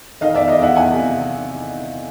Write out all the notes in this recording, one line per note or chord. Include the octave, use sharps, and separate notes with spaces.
D#3 D#5 F5
E2 D5 E5
D#5 F5
E2 E5 F#5
E2 F#5 G#5
C3